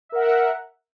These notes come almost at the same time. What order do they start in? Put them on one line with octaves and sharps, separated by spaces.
E5 A#4 F#5